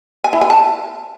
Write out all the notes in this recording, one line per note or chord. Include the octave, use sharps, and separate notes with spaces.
G#5
E4
G#5
A5